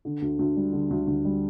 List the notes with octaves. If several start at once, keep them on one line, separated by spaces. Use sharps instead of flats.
D3
D2
D2
G3
D3
D2
D2
G3